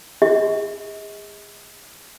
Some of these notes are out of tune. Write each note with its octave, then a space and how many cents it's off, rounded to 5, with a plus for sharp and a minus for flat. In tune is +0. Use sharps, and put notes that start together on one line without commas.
G#4 -25 D#5 +40